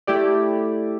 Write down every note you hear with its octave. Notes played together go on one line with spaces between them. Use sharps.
A3 E4 G4 D5